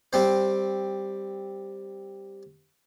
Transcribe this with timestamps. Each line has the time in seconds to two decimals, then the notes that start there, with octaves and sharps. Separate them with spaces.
0.13 G3 C4 C5